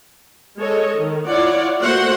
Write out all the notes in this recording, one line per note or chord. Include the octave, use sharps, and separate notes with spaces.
G#3 A4 C#5 D#5
D#3
E4 F4 C#5 D5 F#5
A3 A#3 F#4 C5 F#5